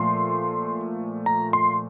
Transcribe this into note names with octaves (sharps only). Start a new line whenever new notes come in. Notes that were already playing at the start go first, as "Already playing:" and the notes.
Already playing: A#2 F3 A3 C6
A#5
C6